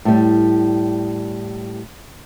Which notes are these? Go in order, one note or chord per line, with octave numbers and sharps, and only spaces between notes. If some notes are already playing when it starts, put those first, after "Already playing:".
A2 G3